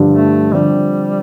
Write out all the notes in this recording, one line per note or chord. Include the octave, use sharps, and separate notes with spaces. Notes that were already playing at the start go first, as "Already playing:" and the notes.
Already playing: G2 D3 F3
A3
D3 F3 G3 C4